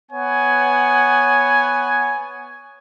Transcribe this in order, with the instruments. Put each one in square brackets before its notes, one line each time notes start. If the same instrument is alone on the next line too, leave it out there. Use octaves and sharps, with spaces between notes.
[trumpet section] B3 C#5 F#5 G#5